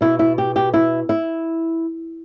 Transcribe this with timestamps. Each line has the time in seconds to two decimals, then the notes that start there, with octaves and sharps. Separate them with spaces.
0.01 B2 B3 E4
0.19 E4
0.38 G4
0.56 G4
0.74 E4
1.09 E4